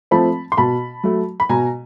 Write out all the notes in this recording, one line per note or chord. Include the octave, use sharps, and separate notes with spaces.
F3 A3 C4 A5 B5
C6
B2 A5 B5
F#3 A3
B5
B2 G#5 A#5